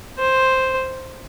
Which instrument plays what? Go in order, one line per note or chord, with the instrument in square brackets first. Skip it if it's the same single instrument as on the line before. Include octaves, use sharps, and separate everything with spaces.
[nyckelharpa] C5